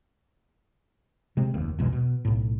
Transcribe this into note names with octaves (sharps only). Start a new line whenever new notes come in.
C3 G#3 C4
F1 D#2
B1 E2 B2 G#3
B2
B1 A2